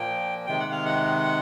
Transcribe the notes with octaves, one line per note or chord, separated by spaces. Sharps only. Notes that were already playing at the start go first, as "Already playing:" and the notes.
Already playing: A#2 F3 A#3 G5
C3 D#3 G#3 G5
F#5
F5
F#5